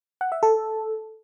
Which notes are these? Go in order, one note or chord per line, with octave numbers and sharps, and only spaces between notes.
F#5
E5
A4